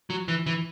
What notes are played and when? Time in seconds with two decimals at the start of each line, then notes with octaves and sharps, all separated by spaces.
0.10 F#3
0.28 E3
0.46 E3